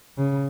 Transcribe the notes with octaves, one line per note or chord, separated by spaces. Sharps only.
C#3